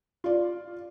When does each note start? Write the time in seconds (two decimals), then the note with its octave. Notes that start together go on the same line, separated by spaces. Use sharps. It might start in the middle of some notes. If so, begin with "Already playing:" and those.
0.24 F4 D5